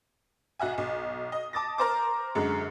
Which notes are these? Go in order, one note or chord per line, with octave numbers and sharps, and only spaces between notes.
B1 F#4 E5 G#5
B1
D#5
A5 D6 D#6 A6 A#6
A#4 C5 D6
F#2 D3 G#3